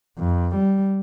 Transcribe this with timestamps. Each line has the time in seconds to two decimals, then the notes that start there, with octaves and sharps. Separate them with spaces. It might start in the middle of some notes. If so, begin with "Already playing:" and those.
0.18 F2
0.55 G3